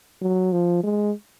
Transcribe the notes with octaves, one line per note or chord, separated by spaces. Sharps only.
F#3
F3
G#3